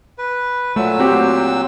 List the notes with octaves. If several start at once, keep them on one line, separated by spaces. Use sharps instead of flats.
B4
A#2 F#3 A3 E6
C4 F#4 G4